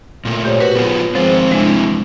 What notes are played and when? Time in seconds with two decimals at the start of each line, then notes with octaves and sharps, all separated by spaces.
0.25 A#2 A3
0.45 G4 C5 C#5
0.60 F#4 A#4 B4
0.75 B3 F4 G#4
1.15 F3 G#3 C4 C5
1.51 C3 E3 G#3 D4